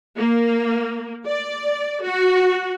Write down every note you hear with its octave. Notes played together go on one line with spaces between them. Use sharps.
A#3
D5
F#4